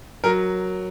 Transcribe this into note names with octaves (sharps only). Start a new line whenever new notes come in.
F#3 A#4